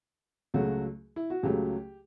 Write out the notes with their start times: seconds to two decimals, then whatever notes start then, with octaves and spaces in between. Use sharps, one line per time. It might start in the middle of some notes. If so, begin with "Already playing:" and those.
0.54 C#2 C#3 F#3 A3 F#4
1.16 E4
1.30 F#4
1.43 C#2 C#3 F#3 A3 G4